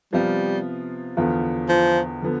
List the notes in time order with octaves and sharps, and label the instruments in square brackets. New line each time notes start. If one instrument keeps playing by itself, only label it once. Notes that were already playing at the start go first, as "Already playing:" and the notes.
[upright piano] C3 F3 B3 F4 [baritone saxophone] G3
[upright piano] E2 D3 F3 B3 F4
[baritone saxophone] F3
[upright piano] D3 F3 B3